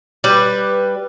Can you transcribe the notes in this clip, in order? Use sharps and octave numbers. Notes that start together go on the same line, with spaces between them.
G3 B4